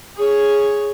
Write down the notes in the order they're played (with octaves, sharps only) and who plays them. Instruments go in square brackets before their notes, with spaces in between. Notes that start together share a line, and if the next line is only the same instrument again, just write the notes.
[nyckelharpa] G#4 C#5